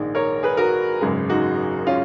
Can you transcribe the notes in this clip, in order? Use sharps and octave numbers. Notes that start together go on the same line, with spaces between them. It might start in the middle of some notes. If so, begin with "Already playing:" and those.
Already playing: A#1 G#2 D#3 G#3
A#4 C#5
G#4 B4
F#4 A#4
G#1 F#2 C#3 G#3
D#4 F#4
C#4 F4